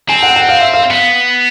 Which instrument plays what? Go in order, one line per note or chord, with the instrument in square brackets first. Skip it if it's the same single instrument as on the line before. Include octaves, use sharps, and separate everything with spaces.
[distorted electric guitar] C4 [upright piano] G#5
[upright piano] F#5
F#5
F5
E5
F5
[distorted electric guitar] B3 [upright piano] F5